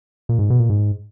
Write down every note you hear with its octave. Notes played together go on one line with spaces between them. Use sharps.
A#2
G#2
B2
A#2
G#2